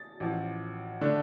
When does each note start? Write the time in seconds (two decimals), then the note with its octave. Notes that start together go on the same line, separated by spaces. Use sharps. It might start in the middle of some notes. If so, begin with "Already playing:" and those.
Already playing: A6
0.20 A1 A2 F3
1.01 D3 A3 D4